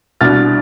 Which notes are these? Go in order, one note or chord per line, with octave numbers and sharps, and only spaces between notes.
C2 B2 B3 D4 F6 A6